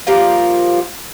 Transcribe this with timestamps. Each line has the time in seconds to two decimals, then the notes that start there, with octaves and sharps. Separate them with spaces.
0.07 F3 G3 A#3 F4